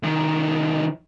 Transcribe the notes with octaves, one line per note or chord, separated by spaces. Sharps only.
C2 D#3